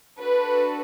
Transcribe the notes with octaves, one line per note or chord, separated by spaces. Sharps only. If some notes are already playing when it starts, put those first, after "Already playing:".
D4 F#4 A4 B4